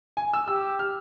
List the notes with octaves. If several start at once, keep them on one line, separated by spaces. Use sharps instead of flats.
G#5
E6
G4 E6
F6